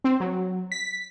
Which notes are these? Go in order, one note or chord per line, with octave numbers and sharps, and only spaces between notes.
C4
F#3
B6